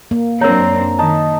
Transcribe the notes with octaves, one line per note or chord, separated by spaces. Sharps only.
A#3
F#2 C4 D4 A#4 C#5 A#5
D#3 D#4 A5